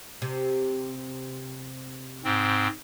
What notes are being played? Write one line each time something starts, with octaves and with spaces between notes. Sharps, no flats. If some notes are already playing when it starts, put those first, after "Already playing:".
C3
G#2 C4